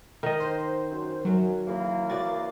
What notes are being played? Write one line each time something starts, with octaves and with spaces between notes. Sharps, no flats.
D#3 D#5
C5
F#2
F#2 F#3
C#3 E3 A#3
F#4 D5 A6